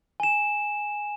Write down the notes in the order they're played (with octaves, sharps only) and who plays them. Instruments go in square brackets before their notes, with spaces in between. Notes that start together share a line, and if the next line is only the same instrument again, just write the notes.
[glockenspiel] G#5 E7